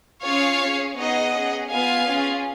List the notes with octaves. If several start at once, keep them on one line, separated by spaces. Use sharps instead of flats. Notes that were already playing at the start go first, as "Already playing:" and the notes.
C#4 F4 G#4 C#5 F5
C#4 G#4
B3 D#4 G#4 D#5 F#5
C#4 G#4
B3 F4 G#4 F5 G#5
C#4 F4 G#4